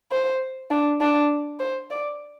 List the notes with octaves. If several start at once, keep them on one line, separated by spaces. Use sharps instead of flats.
C5
D4
D4
C5
D5